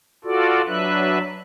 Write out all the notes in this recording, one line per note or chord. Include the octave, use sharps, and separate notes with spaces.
F4 F#4 A4 D5
F#3 D4 B4 E5 F#6